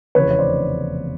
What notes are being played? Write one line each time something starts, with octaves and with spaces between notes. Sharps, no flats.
F1 E2 C#3 B4 C#5
C#5
C5 D5